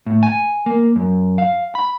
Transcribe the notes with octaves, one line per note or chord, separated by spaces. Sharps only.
A2
G#5
A#3
F#2
F5
B5